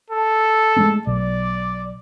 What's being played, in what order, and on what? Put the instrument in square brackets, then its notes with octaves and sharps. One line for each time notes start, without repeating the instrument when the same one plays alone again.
[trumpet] A4
[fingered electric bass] G#3 A3 C#4
[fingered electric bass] B1 [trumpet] D5